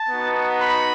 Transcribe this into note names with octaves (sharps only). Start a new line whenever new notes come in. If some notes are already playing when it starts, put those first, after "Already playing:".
Already playing: A5
B3 D#4 F#4
B5